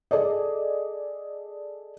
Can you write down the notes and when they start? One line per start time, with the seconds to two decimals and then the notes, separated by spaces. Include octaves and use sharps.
0.11 G#4 A4 D5 D#5